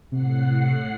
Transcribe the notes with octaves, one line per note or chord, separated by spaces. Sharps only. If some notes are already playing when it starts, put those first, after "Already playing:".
A2 C3 F#5 C7